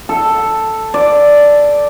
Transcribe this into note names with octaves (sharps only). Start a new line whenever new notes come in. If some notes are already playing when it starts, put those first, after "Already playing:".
A4
D5